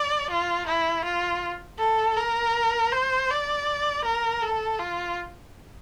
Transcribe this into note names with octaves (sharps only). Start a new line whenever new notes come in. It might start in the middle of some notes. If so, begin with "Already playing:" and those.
Already playing: D5
F4
E4
F4
A4
A#4
C5
D5
A#4
A4
F4